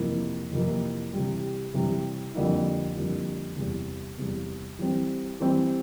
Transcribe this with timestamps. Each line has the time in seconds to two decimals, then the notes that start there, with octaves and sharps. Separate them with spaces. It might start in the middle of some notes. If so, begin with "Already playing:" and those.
Already playing: F2 C3 E3 A#3 E4
0.51 F2 C3 E3 A#3 E4
1.13 C3 E3 G3
1.74 C3 E3 G3
2.35 F2 D3 G3 A#3 E4
2.96 F2 D3 G3 A#3 E4
3.56 E2 C3 G3
4.18 E2 C3 G3
4.79 E3 G3 C4
5.40 E3 G3 C4